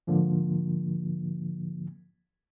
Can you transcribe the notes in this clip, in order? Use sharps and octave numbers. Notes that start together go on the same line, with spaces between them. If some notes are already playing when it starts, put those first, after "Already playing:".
G#2 D3 F3 A#3